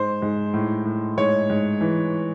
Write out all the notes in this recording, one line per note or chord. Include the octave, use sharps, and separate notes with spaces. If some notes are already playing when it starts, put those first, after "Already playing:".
Already playing: G#2 C5
G#2
A2
A2
G#2 C#5
G#2
E3